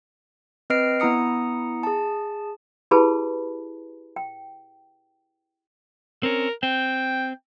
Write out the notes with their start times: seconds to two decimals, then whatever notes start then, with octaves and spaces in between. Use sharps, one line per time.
0.70 C4 B4 D#5 F6 C7 D7
1.00 B3 E4 A#5 D#6 C#7
1.83 G#4 A5
2.91 E4 G4 G#4 B4 A5 B5
4.16 G5
6.23 C4 C#4 A#4
6.63 C4 G5